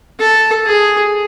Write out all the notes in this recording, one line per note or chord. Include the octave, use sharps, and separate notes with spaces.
A4
G#4